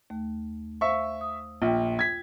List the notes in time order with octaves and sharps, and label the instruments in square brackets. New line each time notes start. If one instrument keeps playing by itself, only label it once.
[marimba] D#2 A3
[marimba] C5 F5 [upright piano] E5 C#6
[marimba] D#6
[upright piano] A#1 [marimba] F4 G5
[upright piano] G#6 B6